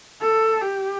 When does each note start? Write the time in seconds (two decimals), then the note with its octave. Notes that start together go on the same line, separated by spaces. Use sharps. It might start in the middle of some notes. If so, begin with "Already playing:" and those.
0.22 A4
0.62 G4